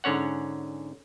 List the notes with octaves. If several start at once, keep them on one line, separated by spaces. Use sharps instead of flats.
G#2 D3 C#4 C#5 F#5